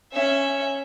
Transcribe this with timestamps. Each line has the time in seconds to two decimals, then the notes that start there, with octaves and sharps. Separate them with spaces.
0.12 C#4 E5